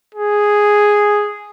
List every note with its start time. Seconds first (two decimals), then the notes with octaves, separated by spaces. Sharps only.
0.15 G#4